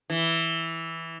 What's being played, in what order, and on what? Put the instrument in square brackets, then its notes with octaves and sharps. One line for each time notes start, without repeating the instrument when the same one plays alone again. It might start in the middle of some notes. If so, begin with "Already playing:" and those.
[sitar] E3